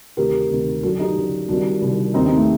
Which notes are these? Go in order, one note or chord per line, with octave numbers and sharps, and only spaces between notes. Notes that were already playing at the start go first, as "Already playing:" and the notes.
D2 C3 D#3 G4 A#4
D2 C3 D#3
F#2 D3 F#4 A4
D#4 G4
F#2 D3
C2 C3 D#3 D4 F#4
C2 C3 D#3
D#2 D#3 C4 D#4
C4 D#4
A3 C4